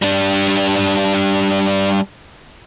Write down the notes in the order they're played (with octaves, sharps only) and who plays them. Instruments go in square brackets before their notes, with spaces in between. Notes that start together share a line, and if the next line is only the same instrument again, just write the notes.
[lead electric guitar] G3 D4